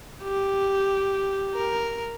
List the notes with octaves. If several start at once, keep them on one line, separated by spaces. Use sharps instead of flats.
G4
A#4